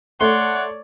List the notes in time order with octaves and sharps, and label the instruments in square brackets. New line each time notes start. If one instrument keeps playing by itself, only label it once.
[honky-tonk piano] A3 [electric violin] C#5 D5 [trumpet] F#5 [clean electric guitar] C6